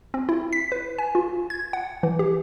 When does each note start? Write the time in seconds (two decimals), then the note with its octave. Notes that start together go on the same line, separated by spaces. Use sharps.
0.14 C4
0.29 E4
0.53 B6
0.72 B4
0.98 G#5
1.15 F4
1.50 G#6
1.73 F#5
2.03 E3
2.19 G4